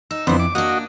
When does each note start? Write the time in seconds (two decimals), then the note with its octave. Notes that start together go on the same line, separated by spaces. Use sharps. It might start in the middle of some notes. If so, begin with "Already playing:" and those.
0.11 D#4 E6
0.27 F2 D3 B3 C4 E4
0.39 D6
0.55 A#3 D4 F#4 D#5